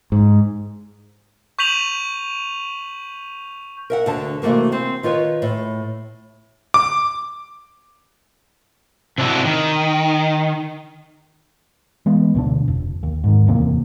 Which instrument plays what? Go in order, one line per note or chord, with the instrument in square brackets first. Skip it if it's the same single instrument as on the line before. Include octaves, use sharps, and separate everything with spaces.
[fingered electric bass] G#2
[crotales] C#6 G6 B6 D#7 F7 F#7
[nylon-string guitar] A#4 E5 F#5
D2 D3 A5
C3 E3 A3 A#3 F#4
C4
D#3 F4 B4 C#5
A2
[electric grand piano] D6
[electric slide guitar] C3 D4 E4 F#4
D#3
[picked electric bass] E3 G#3 B3
D2 B2 D4
F1
D#2
G#2 D#3
D1 E2 C3 A#3